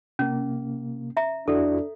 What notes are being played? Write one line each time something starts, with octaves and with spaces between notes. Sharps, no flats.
C3 A#3 C#4
E5 A#5
F2 D4 E4 F#4 A4